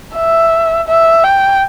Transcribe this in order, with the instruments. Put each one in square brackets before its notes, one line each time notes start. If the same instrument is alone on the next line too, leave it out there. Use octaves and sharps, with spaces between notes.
[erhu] E5
E5
G5